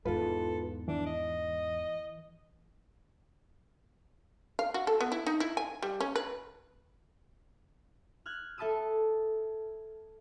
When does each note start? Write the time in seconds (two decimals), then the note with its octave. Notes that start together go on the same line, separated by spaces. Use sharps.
0.06 E2 G#2 F4 A4 B4
0.88 E3 D4
1.06 D#5
4.59 F5
4.74 F#4
4.87 A4
5.01 B3
5.12 E4
5.26 D#4
5.40 E4
5.57 G#5
5.82 G3
6.00 C#4
6.16 B4
8.26 F6 F#6 G#6
8.58 A4 E5 A5 B5 D#6 E6